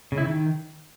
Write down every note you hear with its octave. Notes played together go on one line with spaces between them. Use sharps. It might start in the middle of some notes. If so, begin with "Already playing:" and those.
C#3
E4
D#3